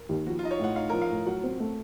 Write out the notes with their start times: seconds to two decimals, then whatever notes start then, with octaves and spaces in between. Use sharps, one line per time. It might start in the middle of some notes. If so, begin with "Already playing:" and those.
Already playing: A#4
0.09 D#2
0.26 F3 F#4
0.39 F4
0.43 D#4 D#5
0.51 C#5
0.59 A2 F#5
0.76 D#4 F5
0.89 A#4
0.93 F3
1.02 F5
1.10 A2
1.26 F#3 F#5
1.44 C4
1.60 A3